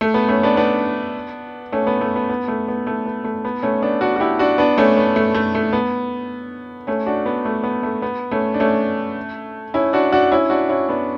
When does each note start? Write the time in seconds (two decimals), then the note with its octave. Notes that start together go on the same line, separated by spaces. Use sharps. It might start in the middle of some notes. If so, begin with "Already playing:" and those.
0.01 A3
0.14 B3
0.28 A3 C#4
0.43 B3 D4
0.57 B3 D4
1.72 A3 C#4
1.87 B3
2.01 A3
2.16 B3
2.29 B3
2.48 A3
2.68 B3
2.87 A3
3.06 B3
3.24 A3
3.45 B3
3.63 A3 C#4
3.82 B3 D4
4.01 D4 F#4
4.16 F#4
4.20 E4 G4
4.39 D4 F#4
4.58 B3 D4
4.78 A3 C#4
4.97 B3
5.16 A3
5.34 A3
5.55 A3
5.73 B3
6.87 A3 C#4
7.07 D4 F#4
7.26 B3
7.45 A3
7.63 B3
7.83 A3
8.02 B3
8.31 A3 C#4
8.54 D4
8.60 A3 C#4
9.74 C#4 E4
9.93 D4 F#4
10.12 D4 F#4
10.31 C#4 E4
10.50 D4 F#4
10.69 C#4 E4
10.89 B3 D4